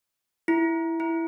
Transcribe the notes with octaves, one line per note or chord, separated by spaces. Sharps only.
E4
E4